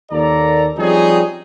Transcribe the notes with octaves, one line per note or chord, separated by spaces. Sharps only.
D#2 A#3 A4 D5 A#5
F3 G3 C4 C#4 D#4 G#4